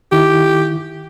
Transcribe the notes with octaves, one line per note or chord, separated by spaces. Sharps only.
D#3 E4 G4